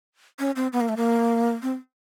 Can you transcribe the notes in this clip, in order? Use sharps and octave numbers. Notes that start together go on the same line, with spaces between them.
C#4
C4
B3
A#3
A3
A#3
C4